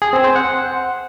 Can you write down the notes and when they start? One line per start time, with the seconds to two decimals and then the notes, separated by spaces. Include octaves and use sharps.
0.02 G#4
0.13 C4
0.24 C5
0.36 F#5